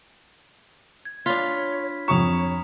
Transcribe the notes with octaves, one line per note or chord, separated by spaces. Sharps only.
G#6
D4 F4 C#5 B5 F6 B6
F2 C#5 A#5 C#6 D#6 F7